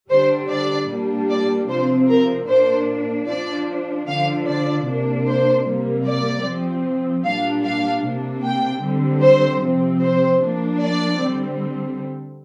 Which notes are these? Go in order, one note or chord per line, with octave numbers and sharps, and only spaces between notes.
D3 G3 D4 C5
D5
A#2 G3 A#3 D4
D5
C3 F3 C4 C5
A#4
A#2 A#3 D4 C5
F3 D4 D5
D3 F3 D4 F5
D5
C3 A#3 D4
C5
C3 G3 A#3
D5
F3 C4
A#2 G3 D4 F5
F5
C3 A#3 D4
G5
D3 G3 C4
C5
C3 F3 C4
C5
F3 A#3 D4
D5
D3 G3 C4